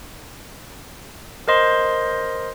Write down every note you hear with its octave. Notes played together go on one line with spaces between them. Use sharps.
A#4 C5 D#5 C6